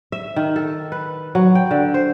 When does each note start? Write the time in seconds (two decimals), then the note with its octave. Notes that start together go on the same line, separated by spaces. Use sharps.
0.12 E5
0.36 D#3
0.56 A4
0.92 B4
1.35 F#3
1.55 G5
1.71 D3
1.94 C5